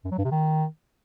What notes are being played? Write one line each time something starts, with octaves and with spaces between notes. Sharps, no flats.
F#2
F#3
G2
C3
D#3